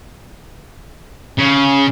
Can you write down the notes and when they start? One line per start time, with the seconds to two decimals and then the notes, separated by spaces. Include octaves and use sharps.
1.38 C#3